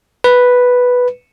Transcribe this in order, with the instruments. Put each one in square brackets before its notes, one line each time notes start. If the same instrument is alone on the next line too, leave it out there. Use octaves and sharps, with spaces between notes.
[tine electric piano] B4